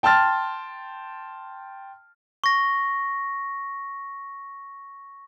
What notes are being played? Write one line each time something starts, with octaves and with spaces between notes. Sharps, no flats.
G5 A5 C6 F6 A6
C#6 A#6